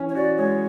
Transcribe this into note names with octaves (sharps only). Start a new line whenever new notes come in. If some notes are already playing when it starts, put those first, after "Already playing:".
Already playing: E3 C#4
C#5
F#4 D5
G#3 C#5